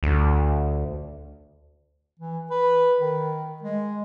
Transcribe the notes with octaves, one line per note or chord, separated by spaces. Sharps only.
D2
E3
B4
D#3
G#3